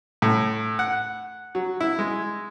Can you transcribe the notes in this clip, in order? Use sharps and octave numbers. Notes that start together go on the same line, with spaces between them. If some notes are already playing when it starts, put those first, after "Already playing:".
A2
F#5
F#3
E4
G#3